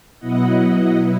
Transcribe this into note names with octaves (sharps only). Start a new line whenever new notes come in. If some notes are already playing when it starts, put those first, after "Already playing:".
B2 F#3 B3 E4 D#5 F#5